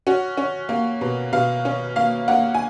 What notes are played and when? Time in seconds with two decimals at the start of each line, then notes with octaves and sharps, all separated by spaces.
0.07 C#4 F#4
0.37 C#4
0.69 A#3
1.01 B2
1.32 B2 F5
1.65 C#4
1.96 A#3 F5
2.28 A#3 F#5
2.55 G#5